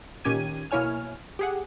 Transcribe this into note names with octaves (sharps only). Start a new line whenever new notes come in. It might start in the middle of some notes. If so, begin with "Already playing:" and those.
A#2 D#3 C#4 G4 G#6 D#7
B2 A#3 E4 C#5 G#5 F6
G4 G#4 F#5